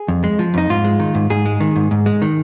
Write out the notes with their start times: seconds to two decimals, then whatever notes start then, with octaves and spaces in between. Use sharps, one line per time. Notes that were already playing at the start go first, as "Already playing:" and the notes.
Already playing: G#4
0.08 F2
0.24 G#3
0.39 F3
0.54 F2 D#4
0.69 G#2 F4
0.84 G#3
1.00 D#3
1.15 G#2
1.30 G#2 G#4
1.46 G#3
1.60 D#3
1.76 G#2
1.91 G#2
2.06 G#3
2.22 D#3